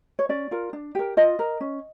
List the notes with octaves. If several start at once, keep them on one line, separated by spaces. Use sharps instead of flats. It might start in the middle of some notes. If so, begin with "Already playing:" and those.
C#5
C#4 D5
F4 A#4
D4
G4 A#4
F4 D#5
A#4
C#4